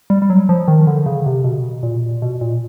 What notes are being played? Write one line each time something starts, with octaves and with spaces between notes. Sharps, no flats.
G3
G3
F#3
F3
D#3
D3
C#3
C3
B2
A#2
B2
A#2